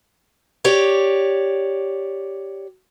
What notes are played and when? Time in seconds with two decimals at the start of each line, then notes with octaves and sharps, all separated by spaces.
0.64 G4 C#5 D5